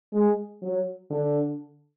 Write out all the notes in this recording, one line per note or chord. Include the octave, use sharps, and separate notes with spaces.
G#3
F#3
D3